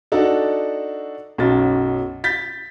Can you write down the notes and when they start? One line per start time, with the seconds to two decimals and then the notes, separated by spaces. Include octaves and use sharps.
0.12 D4 D#4 F#4 A4
1.38 B1 F#2 F#3 A6
2.24 G6 A6 B6